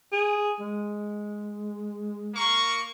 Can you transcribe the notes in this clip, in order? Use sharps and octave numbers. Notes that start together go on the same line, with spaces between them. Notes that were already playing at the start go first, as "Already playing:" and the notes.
G#4
G#3
A#3 A#4 C#6